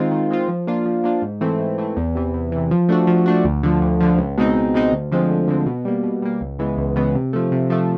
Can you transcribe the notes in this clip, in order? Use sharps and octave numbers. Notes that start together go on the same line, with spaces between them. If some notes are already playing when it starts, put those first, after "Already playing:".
Already playing: D#3 G#3 C4 F4
D#3
G#3 C4 F4
F3
A#3 D4 F4
F3
A#3 D4 F4
G#2
E3 A3 C4 E4
G#2
E3 A3 C4 E4
E2
C3 E3
E2
C3 E3
F3
A3 D4 F#4
F3
A3 D4 F#4
D2
D3 F3
D2
D3 F3
C#2
B2 G#3 C4 D#4
C#2
B2 G#3 C4 D#4
D2
D3 F3 G#3 C4
D2
D3 F3 G#3 C4
B2
G3 A#3
B2
G3 A#3
C#2
C#3 E3 G#3 B3
C#2
C#3 E3 G#3 B3
C3
F3 A3
C3
F3 A3